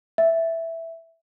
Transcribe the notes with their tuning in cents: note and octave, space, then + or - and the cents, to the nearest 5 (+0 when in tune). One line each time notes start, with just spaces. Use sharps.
E5 +0